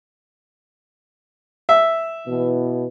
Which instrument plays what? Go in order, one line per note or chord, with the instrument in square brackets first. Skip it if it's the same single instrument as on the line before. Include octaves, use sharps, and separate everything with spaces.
[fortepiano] E5
[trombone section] B2 E3